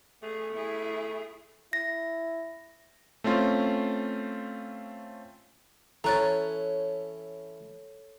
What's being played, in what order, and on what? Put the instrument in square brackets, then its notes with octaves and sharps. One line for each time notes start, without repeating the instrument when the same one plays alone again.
[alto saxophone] A3 [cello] G#4
[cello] E4 G#4
[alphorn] E4 [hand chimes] A#6
[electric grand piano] A3 C4 C#4 F4
[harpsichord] E3 C#4 [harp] A4 C#5 [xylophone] A#5 F#6 A6